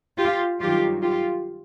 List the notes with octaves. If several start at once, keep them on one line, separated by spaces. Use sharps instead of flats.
F4 G4
G2 D#3 F#3 F4 G4
F4 G4